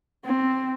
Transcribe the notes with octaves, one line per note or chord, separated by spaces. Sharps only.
C4